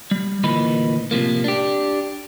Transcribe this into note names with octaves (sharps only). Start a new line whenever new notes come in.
G3
D2 A#2 D#3 E3 D#4 B5
A2 C3 F3 A#3
D4 G4